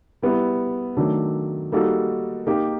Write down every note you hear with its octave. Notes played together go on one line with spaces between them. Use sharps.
G3 B3 E4
D#3 F#3 A3 D4
G3 A#3 D#4 F#4 A4
A#3 D#4 G4